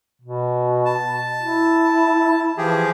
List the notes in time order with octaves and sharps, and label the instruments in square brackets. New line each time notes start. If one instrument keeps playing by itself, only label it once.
[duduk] B2
[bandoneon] A5
[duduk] E4
[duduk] E3 [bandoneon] F3 G4 G#4